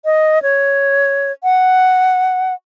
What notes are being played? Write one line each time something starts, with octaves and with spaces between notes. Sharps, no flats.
D#5
C#5
F#5